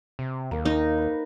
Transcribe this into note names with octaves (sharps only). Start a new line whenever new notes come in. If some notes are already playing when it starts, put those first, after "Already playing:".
C3
D#2 A#3
D#4
B4 C5